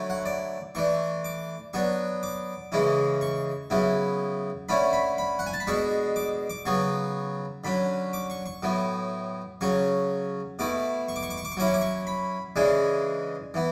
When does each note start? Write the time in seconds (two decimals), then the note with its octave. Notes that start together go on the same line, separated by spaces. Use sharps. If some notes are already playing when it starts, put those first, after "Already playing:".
Already playing: D3 F#3 A3 E4
0.10 F#5
0.25 D5
0.75 E3 A3 D4 C#6
1.24 D6
1.73 F#3 B3 D4 C#6
2.23 D6
2.72 C#3 E3 G#3 C#4 E4
3.21 C#6
3.70 C#3 F#3 B3 E4
4.69 D3 A3 C#4 E4 B5
4.93 B5
5.18 B5
5.39 F#5
5.46 G#5
5.53 A5
5.60 B5
5.67 B2 G#3 D4 C#6
6.16 D6
6.50 D6
6.65 C#3 F#3 B3 C#6
7.64 D3 F#3 C#4 B5
8.13 D6
8.30 C#6
8.46 C#6
8.63 A2 F#3 B3
9.61 C#3 F#3 C#4 C#6
10.59 B2 A3 E4 D6
11.08 C#6
11.16 D6
11.23 C#6
11.30 D6
11.38 C#6
11.45 D6
11.52 C#6
11.57 F#3 C#4 E4 D6
11.67 C#6
11.74 D6
11.81 C#6
12.07 B5
12.56 C#3 E3 G#3 D4 G#5
13.54 E3 B3